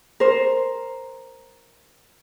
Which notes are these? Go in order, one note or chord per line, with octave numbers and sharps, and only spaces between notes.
A#4 C5